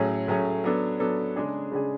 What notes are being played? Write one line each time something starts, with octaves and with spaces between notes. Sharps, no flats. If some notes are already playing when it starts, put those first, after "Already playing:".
Already playing: A2 F#3 A3 C#4 G#4
A2 F#3 A3 C#4 G#4
F#3 B3 D4 A4
F#3 B3 D4 A4
C#3 G#3 D4 G#4
C#3 G#3 D4 G#4